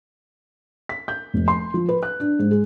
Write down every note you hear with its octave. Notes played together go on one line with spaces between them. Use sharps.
B6
G6
F1
C6
F3
B4
F#6
D4
G#2
G#3